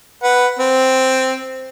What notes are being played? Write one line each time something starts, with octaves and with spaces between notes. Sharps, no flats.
B4 F#5
C4